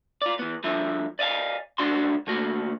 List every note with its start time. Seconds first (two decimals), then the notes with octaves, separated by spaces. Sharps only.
0.22 F4 D5
0.39 E3 B3
0.64 G2 D3 F3 E5
1.19 D5 D#5 F5 F#5 G#5
1.78 C#2 G2 D3 D4 F#4 C6
2.27 D3 A3 A#3 F#4